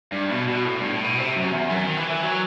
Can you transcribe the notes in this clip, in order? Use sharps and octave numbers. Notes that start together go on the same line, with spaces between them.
G2
B2
B2
A2
G2
A2
B2
C3
F#2
E2
F#2
D#3
E3
E3
F#3